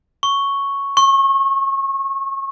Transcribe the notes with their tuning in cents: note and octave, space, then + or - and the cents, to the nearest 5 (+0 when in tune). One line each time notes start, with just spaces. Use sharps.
C#6 +0
C#6 -30